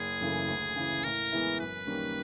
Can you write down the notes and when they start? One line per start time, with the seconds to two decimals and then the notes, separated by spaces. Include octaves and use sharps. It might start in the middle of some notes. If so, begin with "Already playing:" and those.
Already playing: F#1 G#4
0.21 F#2 C#3 E3 A3
0.49 D2
0.76 C#3 E3
1.04 A2 A#4
1.32 E3 G#3 B3 E4
1.60 F#2 B4
1.87 D#3 G3 A#3 C#4